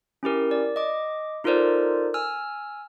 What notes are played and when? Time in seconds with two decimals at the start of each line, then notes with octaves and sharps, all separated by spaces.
0.23 C#4 E4 G4 A#4
0.51 D5
0.76 D#5 D6
1.44 D#4 F4 A4 A#4 C5 D5
2.14 G#5 E6 F6